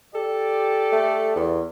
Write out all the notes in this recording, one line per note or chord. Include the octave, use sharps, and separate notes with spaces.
G4 A4 D5
A3
E2